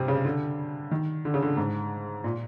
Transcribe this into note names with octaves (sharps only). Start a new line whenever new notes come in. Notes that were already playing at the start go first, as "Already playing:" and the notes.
Already playing: G2 C3
C#3
D3
D#3
D3
C#3
D3
G#2
A#2